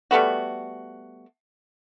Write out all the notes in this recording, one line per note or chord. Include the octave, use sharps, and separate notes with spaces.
G3 A3 B3 F#4